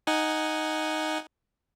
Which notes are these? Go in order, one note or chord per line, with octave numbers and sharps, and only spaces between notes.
D#4 F#5 G#5